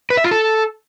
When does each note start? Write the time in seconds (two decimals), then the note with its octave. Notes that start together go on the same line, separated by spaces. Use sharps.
0.10 B4
0.17 E5
0.24 F4
0.31 A4